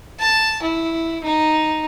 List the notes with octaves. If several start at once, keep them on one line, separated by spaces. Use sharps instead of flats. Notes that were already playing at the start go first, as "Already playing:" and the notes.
A5
E4
D#4